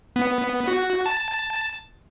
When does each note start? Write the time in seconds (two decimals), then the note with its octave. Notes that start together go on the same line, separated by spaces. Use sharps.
0.16 B3
0.68 F#4
1.06 A5